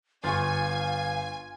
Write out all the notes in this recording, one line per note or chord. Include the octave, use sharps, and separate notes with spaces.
G1 F4 F5 G#5 C#6